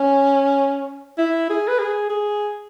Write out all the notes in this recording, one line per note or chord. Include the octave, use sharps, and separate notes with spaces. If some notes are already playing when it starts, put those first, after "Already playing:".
Already playing: C#4
E4
G#4
B4
G#4
G#4